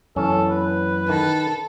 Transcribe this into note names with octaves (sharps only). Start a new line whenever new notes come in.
F#2 E3 C#4 A4
B4
D#3 A4